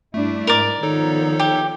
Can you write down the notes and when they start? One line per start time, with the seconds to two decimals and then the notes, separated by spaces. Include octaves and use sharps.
0.14 G2 A3 D4 E4
0.47 G#2 A#4 D5
0.83 D#3 F3 B3 D#4 A4 C#5
1.40 G4